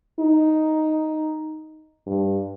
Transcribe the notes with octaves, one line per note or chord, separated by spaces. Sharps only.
D#4
G2